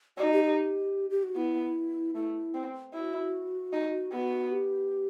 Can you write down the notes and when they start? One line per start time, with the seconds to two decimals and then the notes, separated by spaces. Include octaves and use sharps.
0.17 D#4 F#4
0.31 G4
0.44 G4
1.10 G4
1.23 F#4
1.36 B3 E4
2.15 A3 E4
2.54 C4
2.94 E4 F#4
3.73 D#4
4.12 B3 F#4
4.51 G4